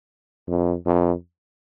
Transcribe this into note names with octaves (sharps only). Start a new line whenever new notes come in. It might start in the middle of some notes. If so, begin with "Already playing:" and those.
F2
F2